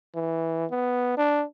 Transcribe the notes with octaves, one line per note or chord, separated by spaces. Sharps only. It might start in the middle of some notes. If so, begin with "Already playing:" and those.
E3
B3
D4